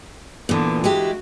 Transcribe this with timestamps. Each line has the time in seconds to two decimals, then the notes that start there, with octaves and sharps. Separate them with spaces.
0.49 A#2 D3 E3 B3
0.84 G#3 E4 F#4 G4